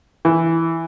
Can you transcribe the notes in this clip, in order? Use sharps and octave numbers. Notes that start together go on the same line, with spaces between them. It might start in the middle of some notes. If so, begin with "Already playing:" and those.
E3